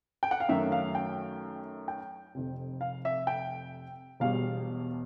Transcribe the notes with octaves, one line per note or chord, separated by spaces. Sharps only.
G5
F#5
F5
F#2 D#3 F#3 A3 E5
F5
G5
G5
F1 F2 C3
F5
E5
G5
E1 E2 B2 G3 F5